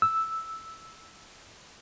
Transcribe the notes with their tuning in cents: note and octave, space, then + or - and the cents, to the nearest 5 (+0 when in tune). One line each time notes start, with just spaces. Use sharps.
E6 -5